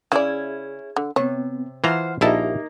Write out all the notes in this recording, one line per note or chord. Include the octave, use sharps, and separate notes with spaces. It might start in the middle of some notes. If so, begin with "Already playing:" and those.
C#3 C#4 E4 G#4 D5
D3
C3 B3 C4 C#5
E3 F4 C5 F#5 A#5 F6
A#1 A#3 D#4 E4 G4 E5 A5